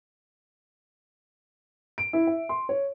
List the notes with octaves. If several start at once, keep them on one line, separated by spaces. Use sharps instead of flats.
D7
E4
E5
C6
C#5